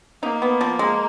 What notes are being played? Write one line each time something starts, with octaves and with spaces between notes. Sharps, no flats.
A#3 D#4
B3
F3
G#3